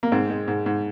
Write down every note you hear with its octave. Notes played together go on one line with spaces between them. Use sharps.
A#3
G#2 C4
G#3
G#2
G#2